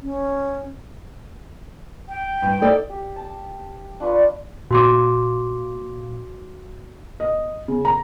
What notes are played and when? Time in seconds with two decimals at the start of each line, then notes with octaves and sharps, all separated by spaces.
0.02 C#4
2.08 G5
2.42 G2
2.61 D#4 A4 D5
2.89 G4
3.16 A5
4.00 D4 F4 B4 C#6
4.71 A#2 F#4 C6 D6
7.20 D#5
7.68 C#3
7.85 A#5